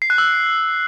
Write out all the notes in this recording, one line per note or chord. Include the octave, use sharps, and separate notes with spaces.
C7
F#6
E6